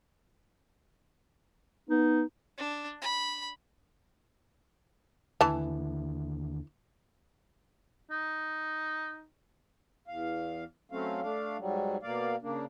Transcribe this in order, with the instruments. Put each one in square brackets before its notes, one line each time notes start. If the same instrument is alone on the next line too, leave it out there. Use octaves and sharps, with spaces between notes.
[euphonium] B3 [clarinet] D#4
[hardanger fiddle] D4
B5
[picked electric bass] D#2 D3 [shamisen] E3 A5
[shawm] D#4
[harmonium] E2 F5
F#3 A3 C4 C#4 F5
A3 D4 F5
G#2 F#3 G3
B2 A#3 D5 F5
C#3 A#3 D4